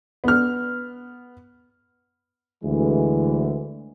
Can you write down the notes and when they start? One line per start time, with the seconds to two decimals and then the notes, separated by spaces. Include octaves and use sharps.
0.24 B3 F6
2.64 D2 E3 G#3